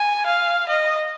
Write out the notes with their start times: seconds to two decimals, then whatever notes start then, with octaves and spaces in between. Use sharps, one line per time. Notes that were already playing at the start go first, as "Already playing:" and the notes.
Already playing: G#5
0.26 F5
0.68 D#5